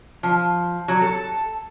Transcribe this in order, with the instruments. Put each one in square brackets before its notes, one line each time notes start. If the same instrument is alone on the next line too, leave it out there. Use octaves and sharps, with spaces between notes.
[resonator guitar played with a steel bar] F3
F#3
A4